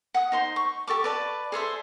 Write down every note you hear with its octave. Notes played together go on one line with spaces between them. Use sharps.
F#5 D#6
D#4 C5 C6
C#6
G4 A4 C#6 D6
B4 D5 A5
G#4 A4 C5 E5